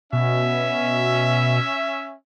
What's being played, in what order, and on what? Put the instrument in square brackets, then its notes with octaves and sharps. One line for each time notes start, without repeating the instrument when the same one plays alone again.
[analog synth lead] B2 [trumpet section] C#4 E5